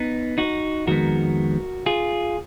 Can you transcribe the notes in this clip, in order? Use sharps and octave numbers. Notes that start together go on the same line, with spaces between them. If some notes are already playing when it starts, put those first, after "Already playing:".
Already playing: B3 D#4
D#4 F#4
F2 D#3 G#3 B3 F#4 A#4
F4 G#4